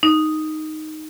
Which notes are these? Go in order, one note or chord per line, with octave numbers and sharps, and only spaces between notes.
D#4